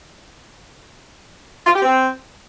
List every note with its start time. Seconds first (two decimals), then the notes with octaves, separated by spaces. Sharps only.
1.67 F4
1.75 G4
1.82 C4